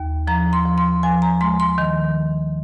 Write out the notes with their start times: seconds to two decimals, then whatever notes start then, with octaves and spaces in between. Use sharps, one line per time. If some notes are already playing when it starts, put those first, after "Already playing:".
Already playing: D#2
0.27 F3 A#5
0.53 C6
0.65 F3
0.78 C6
1.03 F3 G#5
1.22 A#5
1.41 G#3 C6
1.60 C6
1.78 D#3